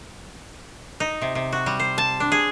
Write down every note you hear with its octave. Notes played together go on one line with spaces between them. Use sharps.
D#4
C3
C3
F#4
G3
C5
A5
D4
G#4